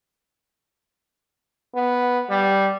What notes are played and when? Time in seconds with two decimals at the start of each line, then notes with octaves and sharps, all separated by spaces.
1.75 B3
2.30 G3